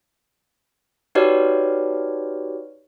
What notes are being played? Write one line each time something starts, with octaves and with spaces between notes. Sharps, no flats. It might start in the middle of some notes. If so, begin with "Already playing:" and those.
D#4 F#4 G4 B4 C#5 D5